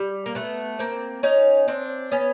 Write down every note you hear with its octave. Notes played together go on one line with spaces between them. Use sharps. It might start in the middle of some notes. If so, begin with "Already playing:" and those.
Already playing: G3
A#3
A3 B3
A#3 C4
C#4 D#4
C4 D4
B3 C#4